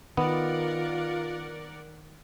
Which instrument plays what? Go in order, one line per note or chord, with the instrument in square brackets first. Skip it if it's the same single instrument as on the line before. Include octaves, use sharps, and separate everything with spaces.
[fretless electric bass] D#3 [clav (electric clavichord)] B3 [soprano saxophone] F4 [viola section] A#4 D5 F#5